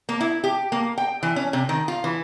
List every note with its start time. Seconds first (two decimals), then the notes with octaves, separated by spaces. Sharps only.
0.09 A#3
0.21 E4
0.44 G4
0.72 A#3
0.98 G5
1.23 E3
1.36 C#4
1.53 C3
1.69 D#3
1.88 F4
2.04 E3